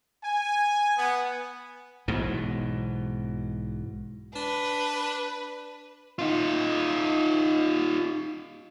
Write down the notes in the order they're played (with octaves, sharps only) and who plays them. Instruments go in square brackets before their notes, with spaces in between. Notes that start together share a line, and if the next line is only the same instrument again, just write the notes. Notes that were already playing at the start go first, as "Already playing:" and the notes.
[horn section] G#5
B3
[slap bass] B1 G#2 B2 E3
[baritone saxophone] D4 [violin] B4
[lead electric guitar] D#4 F4